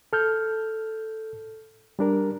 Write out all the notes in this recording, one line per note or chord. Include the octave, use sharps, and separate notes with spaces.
A4 F6 G6
G3 D4 A#4